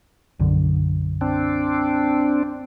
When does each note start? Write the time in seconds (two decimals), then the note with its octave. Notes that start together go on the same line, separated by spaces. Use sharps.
0.40 B1 F#2 D3
1.21 C4 D4